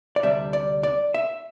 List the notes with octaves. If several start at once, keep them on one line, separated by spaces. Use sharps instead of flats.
D5
D2 C3 G3 D4 E5
D5
D5
E5